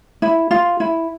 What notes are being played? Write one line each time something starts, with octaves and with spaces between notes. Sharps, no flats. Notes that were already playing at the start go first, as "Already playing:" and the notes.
E4
F4
E4